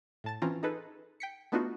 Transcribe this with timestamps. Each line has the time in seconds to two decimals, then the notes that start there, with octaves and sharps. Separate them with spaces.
0.24 A2 A5 A6
0.42 E3 C4 C#4 F4 A#5
0.63 D#4 G#4 A4 B4
1.20 G5 B6 C#7
1.52 A3 B3 D4 D#4 F4 F#4